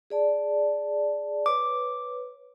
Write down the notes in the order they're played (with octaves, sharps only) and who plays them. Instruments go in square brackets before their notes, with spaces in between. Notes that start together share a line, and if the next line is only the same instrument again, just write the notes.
[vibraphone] G#4 D5 A5
[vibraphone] B4 C#5 [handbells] D6